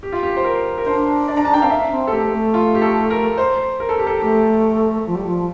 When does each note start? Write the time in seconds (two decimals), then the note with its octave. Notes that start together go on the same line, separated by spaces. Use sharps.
0.03 G4
0.12 F4
0.23 G4
0.37 C5
0.44 A#4
0.78 A#4
0.86 D4 C5
1.28 D5
1.37 A#5
1.45 A5
1.54 G5
1.62 C4 F5
1.70 D4 E5
1.91 C4
2.07 A4
2.12 A3 G4
2.33 A3
2.54 F4
2.75 G4
2.82 A4
3.10 A#4
3.38 C5
3.80 A#4
3.89 A4
3.98 G4
4.07 A4
4.22 A3 G4
5.06 F3
5.15 G3
5.26 F3